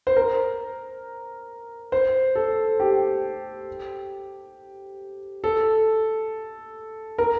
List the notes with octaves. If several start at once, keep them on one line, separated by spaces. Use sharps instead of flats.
C5
A#4
C5
A4
G4
A4
A#4